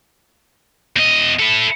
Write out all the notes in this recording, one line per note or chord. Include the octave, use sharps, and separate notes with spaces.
E2 D#5
E4 A4